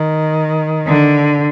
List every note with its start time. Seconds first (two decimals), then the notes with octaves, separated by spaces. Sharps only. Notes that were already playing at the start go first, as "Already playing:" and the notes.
Already playing: D#3
0.87 D3